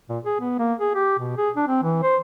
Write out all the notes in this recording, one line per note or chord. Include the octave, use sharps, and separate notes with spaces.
A#2
G#4
B3
A#3
G#4
G4
B2
G#4
D4
C4
E3
C5